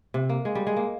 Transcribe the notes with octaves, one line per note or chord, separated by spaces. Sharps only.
C3
A#3
G#3
G3
G#3
A#3